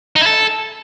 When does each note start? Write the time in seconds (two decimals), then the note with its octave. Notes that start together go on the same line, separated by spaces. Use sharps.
0.16 D#4
0.21 E4
0.26 A4